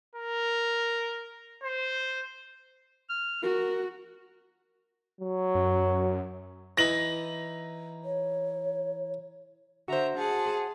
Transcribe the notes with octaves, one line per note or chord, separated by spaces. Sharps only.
A#4
C5
F6
F#4 A#4
F#3
F#2
E3 D#4 B5 A#6 F#7
C#5
D3 F#4 C5 E5 A#5
G#4 F#5 A5